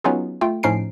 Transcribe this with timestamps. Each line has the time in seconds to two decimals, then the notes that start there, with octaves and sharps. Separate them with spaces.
0.04 F#3 B3 C#4 D#4 F4 G#4
0.41 A3 F4 G5
0.63 A2 F3 C#4 D#4 C7 D7